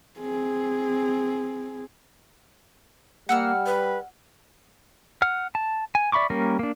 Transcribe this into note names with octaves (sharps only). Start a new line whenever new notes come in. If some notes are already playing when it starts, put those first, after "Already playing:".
C4 G#4
G3 A#3 F#5 E6 F6
B4
F#5 F6
A5
G#5
D5 E5 B5 C#6 D6
G3 A#3 C#4 A#4
A#3 D4